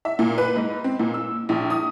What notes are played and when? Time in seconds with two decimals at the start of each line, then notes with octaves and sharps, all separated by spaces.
0.05 E5
0.19 A#2
0.38 B4
0.56 G#2
0.84 C4
0.99 A#2
1.14 E6
1.49 A#1
1.70 D#6